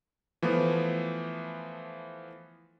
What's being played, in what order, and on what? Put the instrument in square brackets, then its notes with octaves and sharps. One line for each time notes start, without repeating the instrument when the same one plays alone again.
[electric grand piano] E3 F3 A3 B3